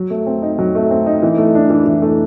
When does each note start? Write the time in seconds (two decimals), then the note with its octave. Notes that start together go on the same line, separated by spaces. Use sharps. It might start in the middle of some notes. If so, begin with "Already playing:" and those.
Already playing: F#3
0.10 A3
0.26 C4
0.42 D#4
0.59 F#3
0.75 A3
0.90 C4
1.06 D#4
1.22 E3
1.38 A3
1.55 D4
1.70 E3
1.86 E3
2.02 A3